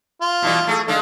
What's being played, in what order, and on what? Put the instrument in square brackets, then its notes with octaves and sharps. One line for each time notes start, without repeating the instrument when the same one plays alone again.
[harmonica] F4
[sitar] B2 E3 G3
A3 F#4 G#4
[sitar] D3 G#3 D4 [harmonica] F5